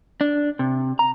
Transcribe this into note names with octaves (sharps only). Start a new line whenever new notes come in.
D4
C3
A#5